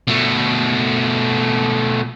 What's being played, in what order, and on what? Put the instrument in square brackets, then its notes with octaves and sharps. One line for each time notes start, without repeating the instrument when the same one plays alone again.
[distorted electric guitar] B2 A3